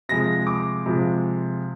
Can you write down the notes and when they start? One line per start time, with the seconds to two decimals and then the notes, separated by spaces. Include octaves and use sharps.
0.09 C3 F3 G#3 A#6
0.47 D6
0.85 C3 F3 G#3